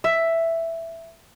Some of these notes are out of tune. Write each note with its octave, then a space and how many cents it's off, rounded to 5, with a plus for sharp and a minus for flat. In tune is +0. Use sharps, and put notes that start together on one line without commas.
E5 +5